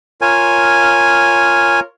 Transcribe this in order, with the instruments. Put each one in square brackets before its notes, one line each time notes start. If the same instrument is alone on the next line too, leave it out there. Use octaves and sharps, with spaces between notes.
[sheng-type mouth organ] F4 A#4 C#5 [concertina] G#5